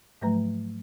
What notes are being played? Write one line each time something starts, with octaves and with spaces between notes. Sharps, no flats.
G#2 F3 F#3 A3 B4 A#5